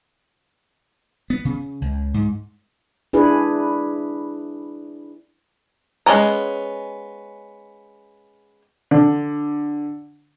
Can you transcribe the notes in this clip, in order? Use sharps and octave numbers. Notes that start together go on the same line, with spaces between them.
B3
C#3
C#2
G#2
D4 E4 G#4 B4
G#3 B3 C#4 A#5
D3